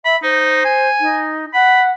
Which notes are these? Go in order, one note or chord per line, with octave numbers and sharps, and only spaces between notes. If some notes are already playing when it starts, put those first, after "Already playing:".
E5 B5
D#4 C5
G#5
D#4
F#5 B5